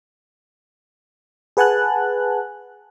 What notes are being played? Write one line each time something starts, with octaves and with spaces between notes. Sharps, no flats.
G#4 B4 F#5 G#5 A5 F#6